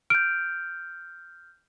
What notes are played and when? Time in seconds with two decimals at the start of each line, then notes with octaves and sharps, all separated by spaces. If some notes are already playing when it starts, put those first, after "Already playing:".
0.10 F6 G6 D7